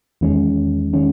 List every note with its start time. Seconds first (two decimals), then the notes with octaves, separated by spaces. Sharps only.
0.21 E2 D#3 G#3 C#4
0.93 D#3 G#3 C#4